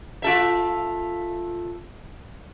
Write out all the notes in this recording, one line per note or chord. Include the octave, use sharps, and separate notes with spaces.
F4 A4 E5